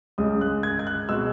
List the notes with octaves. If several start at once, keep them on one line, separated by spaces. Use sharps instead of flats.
C#2 C#3 G#3 D#6
F#6
G#6
G#6
F#6
B2 G#3 E6